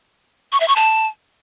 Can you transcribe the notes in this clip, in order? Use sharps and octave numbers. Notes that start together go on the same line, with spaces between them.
C#6
E5
C#6
A5